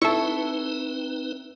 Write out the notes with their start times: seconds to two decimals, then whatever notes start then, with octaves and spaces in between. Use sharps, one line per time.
0.02 C4 D#4 E4 A4 B4 C#6